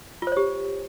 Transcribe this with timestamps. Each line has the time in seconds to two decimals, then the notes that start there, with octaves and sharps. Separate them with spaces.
0.22 F4
0.27 C5
0.32 C#5
0.37 G4